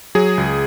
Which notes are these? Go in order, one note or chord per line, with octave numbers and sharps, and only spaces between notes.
F#3 G#4
C#2